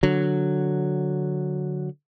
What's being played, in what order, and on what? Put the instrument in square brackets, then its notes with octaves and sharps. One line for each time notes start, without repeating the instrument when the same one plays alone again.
[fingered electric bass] D3 F#3